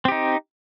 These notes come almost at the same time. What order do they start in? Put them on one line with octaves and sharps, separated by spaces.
C4 G4 D#4